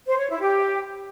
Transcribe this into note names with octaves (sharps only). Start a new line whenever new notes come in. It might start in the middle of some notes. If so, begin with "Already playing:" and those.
C5
C#5
E4
G4